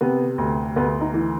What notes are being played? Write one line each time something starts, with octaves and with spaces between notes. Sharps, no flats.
C3 B3
D2
D2 B3
D#4
E3